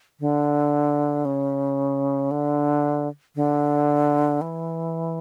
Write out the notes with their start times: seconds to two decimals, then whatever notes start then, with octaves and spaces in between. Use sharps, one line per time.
0.20 D3
1.25 C#3
2.31 D3
3.36 D3
4.41 E3